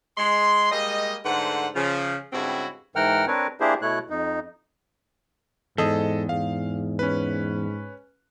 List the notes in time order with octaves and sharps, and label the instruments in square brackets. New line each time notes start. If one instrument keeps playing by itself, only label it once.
[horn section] G#3 C6
G3 G#3 A#3 D#5
G#2 D3 A3 B4 C5 F#5
C#3 F3
G2 C#3 G#3 C4 E4 F#4
[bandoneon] G#2 E3 A#4 F#5 G5 F6
C4 D4 A#4 B4 C#5
A#3 D4 E4 G4 G#4 C5
B2 A3 E4 C#5 F#6
F2 D#4
[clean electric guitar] E2 [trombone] G#2 [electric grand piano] A4 D#5 D#6
[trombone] G#2 [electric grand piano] F5
[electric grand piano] C#4 B4